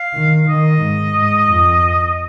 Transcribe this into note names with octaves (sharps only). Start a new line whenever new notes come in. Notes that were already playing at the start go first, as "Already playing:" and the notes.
Already playing: F5
D#3
D#3 D#5
G#2
G#2
F2